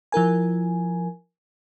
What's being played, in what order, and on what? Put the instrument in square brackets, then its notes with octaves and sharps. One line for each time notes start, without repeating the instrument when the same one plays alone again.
[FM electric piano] F3 E4 A#4 G#5